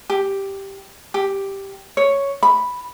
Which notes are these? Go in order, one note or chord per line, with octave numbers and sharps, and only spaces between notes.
G4
G4
C#5
B5